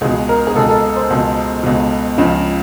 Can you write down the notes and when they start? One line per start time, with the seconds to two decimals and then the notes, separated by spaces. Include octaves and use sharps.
0.01 C#2 B2 G#4
0.29 A#4
0.47 G#4
0.55 C#2 B2 A4
0.69 A4
0.96 C5
1.10 C#2 B2
1.63 C#2 B2
2.17 C#2 C#3 F3